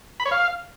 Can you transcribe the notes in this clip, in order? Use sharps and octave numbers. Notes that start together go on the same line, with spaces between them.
B5
C#5
F5